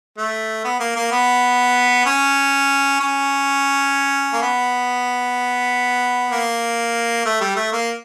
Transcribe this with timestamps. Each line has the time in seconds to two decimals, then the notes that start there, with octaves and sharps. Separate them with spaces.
0.18 A3
0.64 B3
0.80 A#3
0.96 A#3
1.12 B3
2.06 C#4
3.00 C#4
4.33 A#3
4.42 B3
6.30 A#3
7.25 A3
7.41 G3
7.56 A3
7.72 A#3